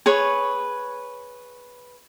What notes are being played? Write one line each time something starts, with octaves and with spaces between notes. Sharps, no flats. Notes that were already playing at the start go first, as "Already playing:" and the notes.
G#4 B4 C#5 C#6